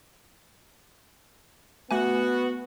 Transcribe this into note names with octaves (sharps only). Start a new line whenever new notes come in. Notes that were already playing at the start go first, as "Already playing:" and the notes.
A3 B3 F#4 G#5